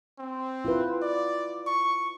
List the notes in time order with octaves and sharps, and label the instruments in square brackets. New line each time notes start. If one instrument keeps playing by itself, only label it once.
[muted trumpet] C4
[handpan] E4 F4 B4
[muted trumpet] D5
C#6